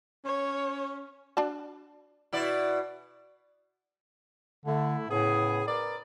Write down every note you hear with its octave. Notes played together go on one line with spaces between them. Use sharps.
C#4 C#5
D4 F#4 A5
B2 E4 D5
D3 A3 E4
A2 C#3 B3 G#4
A#4 B4 D5